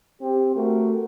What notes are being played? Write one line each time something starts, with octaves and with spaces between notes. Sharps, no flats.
C4 G4
A3 F#4 A#4